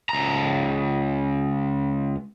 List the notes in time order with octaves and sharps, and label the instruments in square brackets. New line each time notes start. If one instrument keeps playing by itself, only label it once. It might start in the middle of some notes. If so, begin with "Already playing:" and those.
[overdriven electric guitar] C#2 A#5